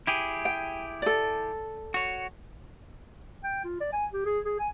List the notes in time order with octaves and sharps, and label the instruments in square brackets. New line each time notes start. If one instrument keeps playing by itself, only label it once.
[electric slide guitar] E4 G4 G#4
[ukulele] G5
A4 D5
[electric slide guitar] F#4 C#5
[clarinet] G5
F4
D5
G#5
G4
G#4
G#4
G#5